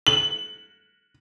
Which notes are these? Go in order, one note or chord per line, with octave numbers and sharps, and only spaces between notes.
F#7